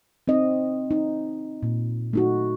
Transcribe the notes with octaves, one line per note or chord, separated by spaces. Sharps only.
C4 D#4 D#5
D#4
A#2
A3 D#4 F#4